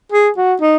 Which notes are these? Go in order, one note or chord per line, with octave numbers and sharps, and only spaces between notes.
G#4
F#4
D#4